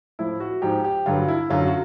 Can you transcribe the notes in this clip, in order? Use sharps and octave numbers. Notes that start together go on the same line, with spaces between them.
A2 F3 E4
F#4
G#2 F3 G4
G4
G2 D3 F#3 F4
E4
F#2 D3 F#3 F4
F#4